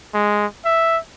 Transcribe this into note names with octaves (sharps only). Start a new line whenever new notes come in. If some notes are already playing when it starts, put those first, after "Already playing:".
G#3
E5